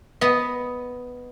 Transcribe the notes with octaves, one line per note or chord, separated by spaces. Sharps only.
B3 D#5